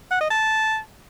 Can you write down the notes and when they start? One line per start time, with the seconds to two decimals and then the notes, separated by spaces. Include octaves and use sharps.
0.11 F#5
0.21 D#5
0.30 A5